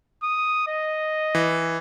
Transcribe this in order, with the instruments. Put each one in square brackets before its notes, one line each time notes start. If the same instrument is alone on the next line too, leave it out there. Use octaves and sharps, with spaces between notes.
[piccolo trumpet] D#6
D#5
[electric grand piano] E3